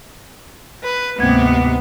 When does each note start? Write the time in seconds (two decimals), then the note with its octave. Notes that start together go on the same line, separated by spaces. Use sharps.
0.83 B4
1.19 D2 G#2 C3 A#3 B3 G#6